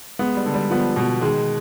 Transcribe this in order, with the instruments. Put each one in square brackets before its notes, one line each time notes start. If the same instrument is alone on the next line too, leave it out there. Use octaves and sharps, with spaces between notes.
[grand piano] G#3 [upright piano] B3
[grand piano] G3
[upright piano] D3
[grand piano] G3
[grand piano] F3 [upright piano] B3
[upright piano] B2
[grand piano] D#3 [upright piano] G#3